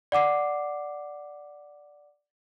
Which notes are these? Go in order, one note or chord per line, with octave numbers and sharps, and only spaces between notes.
D5 F#5 D6 C7